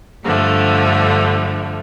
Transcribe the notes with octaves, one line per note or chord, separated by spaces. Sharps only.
G2 D3 F3 A3